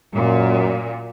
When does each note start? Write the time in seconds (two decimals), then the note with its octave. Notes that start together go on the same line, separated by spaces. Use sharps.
0.15 F#2 A#2